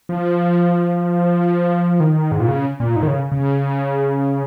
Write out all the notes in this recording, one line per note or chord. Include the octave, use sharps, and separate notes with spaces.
F3
D#3
G#2
A#2
C#3
A#2
G#2
D#3
C#3
C#3